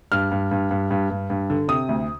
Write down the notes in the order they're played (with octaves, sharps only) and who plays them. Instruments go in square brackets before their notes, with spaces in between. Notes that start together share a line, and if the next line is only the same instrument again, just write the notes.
[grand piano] G2 F6
G2
G2
G2
G2
G2
G2
D3
C3 D#6
D2